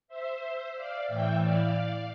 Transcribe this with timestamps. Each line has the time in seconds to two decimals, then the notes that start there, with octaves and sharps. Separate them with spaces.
0.08 C5 E5
0.75 D5 F5
1.08 A2 E3 E5 G5
1.41 D5 F5